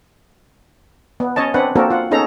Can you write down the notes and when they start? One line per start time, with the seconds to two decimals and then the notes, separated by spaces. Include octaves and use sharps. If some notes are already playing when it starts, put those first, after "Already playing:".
1.20 B3
1.36 C#4 C#5 D#5 A5
1.54 C4 D4 B4 F#5
1.76 A#3 C4 D4 F#4 A4 A#4
1.91 F4 F#5
2.11 B3 C#4 D#4 G#4 A4 A#5